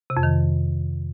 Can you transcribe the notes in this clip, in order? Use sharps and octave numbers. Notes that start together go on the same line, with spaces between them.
C3
F2
D#3